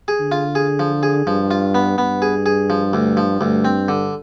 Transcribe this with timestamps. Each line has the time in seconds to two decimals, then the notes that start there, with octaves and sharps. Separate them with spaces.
0.08 G#4
0.20 D3
0.32 F4
0.55 G#4
0.79 F3
1.03 G#4
1.26 G2 F3
1.51 F4
1.75 B3
1.98 G2 B3
2.22 G#4
2.46 G#4
2.70 F3
2.93 D2
3.17 F3
3.41 D2 G2
3.65 C4
3.88 D3